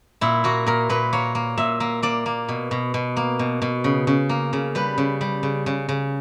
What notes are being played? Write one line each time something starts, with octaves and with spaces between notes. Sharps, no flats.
A#2 E4
A#3 F#4
A#2 A#4
A#2 B4
A#3 C#5
A#3
A#2 E5
A#3
A#3 D5
A#3
B2
B2
B2
A#3
B2
B2
C#3
C#3
A#3
C#3
G3 B4
C#3
G3
C#3
C#3
C#3